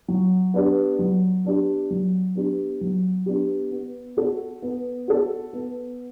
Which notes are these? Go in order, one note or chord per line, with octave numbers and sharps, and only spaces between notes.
F#3
B3 D4 G4
F#3
B3 D4 G4
F#3
B3 D4 G4
F#3
B3 D4 G4
B3
F#4 A4
B3
F#4 A4
B3